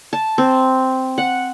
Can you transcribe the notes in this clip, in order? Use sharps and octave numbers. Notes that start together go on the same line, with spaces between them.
A5
C4
F#5